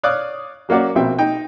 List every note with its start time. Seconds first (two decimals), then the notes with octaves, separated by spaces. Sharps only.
0.03 C#5 D5 F5 D6 D#6 F#6
0.69 F#3 A#3 C#4 F#4 D5
0.95 A#1 B2 C4 E5 G5
1.19 D#4 G5